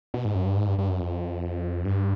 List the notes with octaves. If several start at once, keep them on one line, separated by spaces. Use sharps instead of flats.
B2
G#2
F#2
G2
G#2
G2
G2
F#2
F2
G2